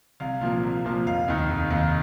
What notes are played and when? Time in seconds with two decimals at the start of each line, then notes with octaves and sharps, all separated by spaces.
0.20 C2 F5
0.41 A#2 F3 A#3
0.63 C2
0.85 A#2 F3 A#3
1.06 F1 F5
1.28 D#2 D#3
1.49 F1
1.70 D#2 D#3